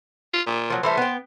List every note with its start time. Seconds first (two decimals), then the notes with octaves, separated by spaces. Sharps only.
0.34 F4
0.47 A#2
0.70 F3 F#3
0.83 E3 G3 A3 C5
0.97 B3 G5